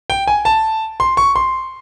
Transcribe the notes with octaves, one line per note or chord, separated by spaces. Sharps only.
G5
G#5
A5
C6
C#6
C6